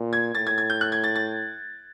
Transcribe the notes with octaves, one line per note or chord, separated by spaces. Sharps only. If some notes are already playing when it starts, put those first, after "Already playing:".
Already playing: A#2
G#6
A2 A6
G#6
G#6
G6
F#6
G#6
A6
A6